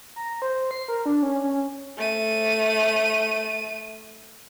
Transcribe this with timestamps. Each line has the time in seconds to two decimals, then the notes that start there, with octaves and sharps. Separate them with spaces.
0.16 A#5
0.42 C5
0.71 C7
0.88 A#4
1.06 D4
1.22 C#4
1.43 C#4
1.97 A3 D#7